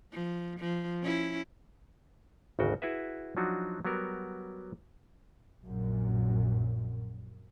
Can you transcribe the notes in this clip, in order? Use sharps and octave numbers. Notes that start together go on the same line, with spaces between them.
F3
F3
C#4 E4
G#1 D2 C#3 F#4 G5
E4 F#4 G#4 B4 E5
F3 F#3 D4 D#4 F#4
F#3 G3 B3 F#4 A#4
A#1 F#2 A#2